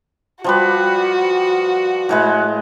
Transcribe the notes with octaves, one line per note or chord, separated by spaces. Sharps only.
F3 G3 F#4 B4
A2 G#3 B4